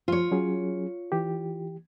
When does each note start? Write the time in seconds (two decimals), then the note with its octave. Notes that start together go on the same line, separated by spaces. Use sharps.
0.08 F3 F4 C#5
0.31 F#3 C#4 G#4
1.12 E3 G4